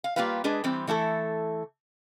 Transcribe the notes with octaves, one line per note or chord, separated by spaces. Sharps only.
F5
G3 A#3 F4 G4 B4 F5
G#3 D4 G#4 B4
E3 G3 C4
E3 A3 E4 A4